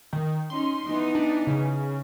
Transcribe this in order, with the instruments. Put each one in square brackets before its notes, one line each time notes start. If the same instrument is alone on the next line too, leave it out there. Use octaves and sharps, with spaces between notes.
[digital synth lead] D#3
[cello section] C#4 D#4 [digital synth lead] C6
[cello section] E3 B3 D#4
[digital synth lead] D4
C#3